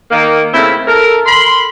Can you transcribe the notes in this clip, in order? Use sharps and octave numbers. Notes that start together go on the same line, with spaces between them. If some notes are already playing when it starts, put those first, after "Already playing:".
D#3 A#3
C#3 A3 C4 E4
A4 A#4
B5 C6